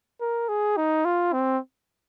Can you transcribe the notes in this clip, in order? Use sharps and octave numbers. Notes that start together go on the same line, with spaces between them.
A#4
G#4
D#4
F4
C4